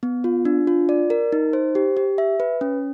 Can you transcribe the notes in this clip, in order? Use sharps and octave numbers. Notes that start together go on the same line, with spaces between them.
B3
F4
D4
F4
D5
A#4
D#4
C5
G4
G4
E5
B4
C#4